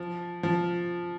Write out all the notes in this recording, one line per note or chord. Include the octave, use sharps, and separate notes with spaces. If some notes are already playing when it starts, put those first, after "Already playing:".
Already playing: F3
F3